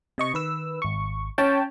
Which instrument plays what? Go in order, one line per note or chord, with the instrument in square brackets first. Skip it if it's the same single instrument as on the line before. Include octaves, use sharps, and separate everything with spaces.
[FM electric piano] C3 D#5 C#6
D#3 B4 E6
G#1 C#6
[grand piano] C#4 [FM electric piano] G5 A5